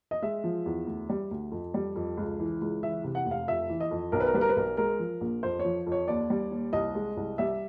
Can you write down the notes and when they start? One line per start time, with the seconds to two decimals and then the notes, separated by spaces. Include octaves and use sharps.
0.11 D#5
0.22 G#3 E5
0.44 F3
0.66 E2
0.87 D2
1.09 G3
1.31 D2
1.52 F2
1.74 G3
1.96 F2
2.17 C#2
2.39 E3
2.61 C#2
2.83 E3 E5
3.04 C3
3.15 F#5
3.26 F1
3.31 F5
3.47 F2 E5
3.69 E3
3.80 D#5
3.91 F2
4.12 B1 A#4
4.20 B4
4.27 A#4
4.34 G3 B4
4.41 A#4
4.49 B4
4.56 B1 A#4
4.77 G#3 A#4
4.99 F3
5.21 A#1
5.43 F2 C5
5.59 F3 C#5
5.87 F2
5.92 C#5
6.08 D#2 D5
6.30 G3
6.51 D#2
6.73 C2 D#5
6.95 G#3
7.17 C2
7.38 G3 E5